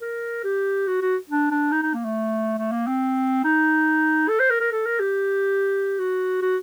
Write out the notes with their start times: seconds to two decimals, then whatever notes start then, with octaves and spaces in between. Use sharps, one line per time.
0.01 A#4
0.44 G4
0.87 F#4
1.01 F#4
1.29 D4
1.51 D4
1.72 D#4
1.83 D#4
1.94 A#3
2.05 A3
2.58 A3
2.71 A#3
2.87 C4
3.44 D#4
4.29 A4
4.39 C5
4.50 A#4
4.61 A#4
4.72 A4
4.86 A#4
5.00 G4
5.99 F#4
6.42 F#4